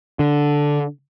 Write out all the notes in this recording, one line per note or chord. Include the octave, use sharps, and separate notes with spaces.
D3